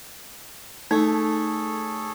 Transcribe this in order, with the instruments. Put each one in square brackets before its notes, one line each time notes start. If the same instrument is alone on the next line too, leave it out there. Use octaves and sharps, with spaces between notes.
[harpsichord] A3 [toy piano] D#4 [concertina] G#4 A4 C#5